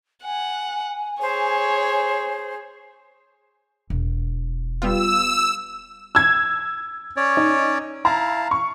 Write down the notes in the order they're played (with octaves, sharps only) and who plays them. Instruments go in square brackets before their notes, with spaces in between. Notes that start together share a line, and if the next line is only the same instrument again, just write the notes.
[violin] F#5 [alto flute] G#5
[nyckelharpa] G#4 [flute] C5 [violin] C#5
[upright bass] E1
[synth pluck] G3 B3 F4 [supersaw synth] E6
[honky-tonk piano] E6 G#6
[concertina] C#4 C#5 D5
[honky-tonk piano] D#4
[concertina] E4 F5 A5 [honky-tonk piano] A#5
[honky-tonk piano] C#6